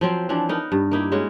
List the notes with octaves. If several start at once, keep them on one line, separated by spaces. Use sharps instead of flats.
F3 F#3 C4
E3 F3 D4
B3 D#4 A#4 F#5
G2
A#3 D#4 E4 G4
G#3 C#4 F#4